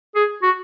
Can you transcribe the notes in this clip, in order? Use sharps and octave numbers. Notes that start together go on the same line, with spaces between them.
G#4
F#4